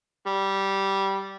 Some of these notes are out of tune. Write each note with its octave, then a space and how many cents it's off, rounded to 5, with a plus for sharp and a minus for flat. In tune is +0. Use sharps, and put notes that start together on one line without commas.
G3 -10